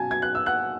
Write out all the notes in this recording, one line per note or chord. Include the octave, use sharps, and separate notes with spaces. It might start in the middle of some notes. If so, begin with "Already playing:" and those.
Already playing: B2 F#3 C#4 G#5 A5 G#6
G#6
F#6
E6
F#5 F#6